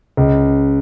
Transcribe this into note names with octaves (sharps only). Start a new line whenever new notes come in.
C#2